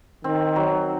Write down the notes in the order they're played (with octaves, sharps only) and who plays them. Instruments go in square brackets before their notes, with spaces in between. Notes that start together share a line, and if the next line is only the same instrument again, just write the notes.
[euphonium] D#3 [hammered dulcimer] C4
[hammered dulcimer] F#3